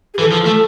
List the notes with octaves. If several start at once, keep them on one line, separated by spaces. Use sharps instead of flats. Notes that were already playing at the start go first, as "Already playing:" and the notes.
G#4
E3 A4
F3
A3